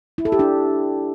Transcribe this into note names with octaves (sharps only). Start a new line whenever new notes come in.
E4
A4
G4
D4